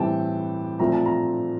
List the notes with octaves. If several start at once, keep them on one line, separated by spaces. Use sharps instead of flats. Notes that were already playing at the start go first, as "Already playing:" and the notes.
Already playing: A2 E3 G3 C4 G5 A5
A#2 F3 A3 C4 A#5
A5
A#5